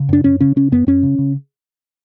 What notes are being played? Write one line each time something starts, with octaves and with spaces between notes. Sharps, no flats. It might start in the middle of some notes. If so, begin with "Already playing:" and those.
Already playing: C#3
F#2 D4
F#2 C#4
C#3 C#4
C#3 C#4
F#2 B3
F#2 C#4
C#3
C#3